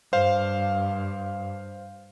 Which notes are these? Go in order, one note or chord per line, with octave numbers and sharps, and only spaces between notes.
G2 C5 F5